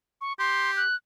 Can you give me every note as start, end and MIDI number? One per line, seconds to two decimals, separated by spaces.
0.21 0.33 85
0.39 0.82 67
0.39 0.71 84
0.77 0.95 90